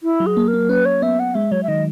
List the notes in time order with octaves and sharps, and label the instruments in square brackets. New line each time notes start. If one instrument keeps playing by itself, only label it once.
[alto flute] E4
[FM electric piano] F#3
[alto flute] G#4
[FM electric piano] A#3
[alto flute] A#4
[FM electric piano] A#3
[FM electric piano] C#4 [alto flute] B4
[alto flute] C#5
[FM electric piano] B3 [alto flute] E5
[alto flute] F#5
[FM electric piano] G#3 [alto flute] E5
[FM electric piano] F#3 [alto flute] C#5
[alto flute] E5
[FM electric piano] D#3 [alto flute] D#5